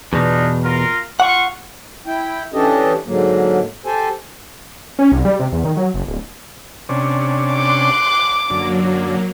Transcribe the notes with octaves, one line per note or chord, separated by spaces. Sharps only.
E2 B2 D4 D#4 F4
F4 A#4
F4 F#5 C#6
E4 G5
E3 C#4 D4 G4 A4 D#5
G#2 D3 F#3 A#3
G4 A4 C5 G#5
C#4
C2
G3
C3
E2
D#3
F#3
F#1
D1
C3 C#4 D4
C6 D6 F#6
F#2 D3 F#3 A#3